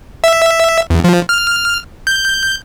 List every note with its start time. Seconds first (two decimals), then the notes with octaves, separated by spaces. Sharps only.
0.24 E5
0.90 E2
1.04 F3
1.29 F6
2.07 G6